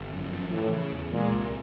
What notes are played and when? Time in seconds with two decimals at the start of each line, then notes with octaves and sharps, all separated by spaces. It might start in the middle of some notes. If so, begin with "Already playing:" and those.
Already playing: G1
0.13 F#2
0.32 F3
0.53 A2 E3
0.73 C#3
0.93 E2
1.12 A#2 G#3
1.31 C2